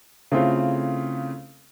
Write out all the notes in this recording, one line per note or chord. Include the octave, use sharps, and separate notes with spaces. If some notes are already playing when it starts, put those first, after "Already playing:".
C#3 A3 C4 E4 F4 A4